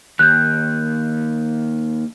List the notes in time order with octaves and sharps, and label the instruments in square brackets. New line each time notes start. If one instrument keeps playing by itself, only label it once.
[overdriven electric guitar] D#2 [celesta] F#6 G6